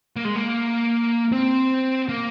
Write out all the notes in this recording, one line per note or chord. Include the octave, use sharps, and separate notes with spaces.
A#3
G#3
A#3
C4
A#3